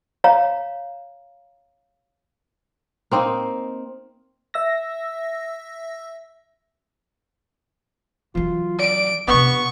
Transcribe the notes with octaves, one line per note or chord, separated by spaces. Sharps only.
C#5 F5 A#5
A#3 C4 D#4 D#5
E5 E6 A#6
E3 F#3 F4
D5 D7
C3 B3 D4 C#6